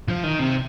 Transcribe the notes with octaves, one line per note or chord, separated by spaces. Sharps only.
F3
D#3
C3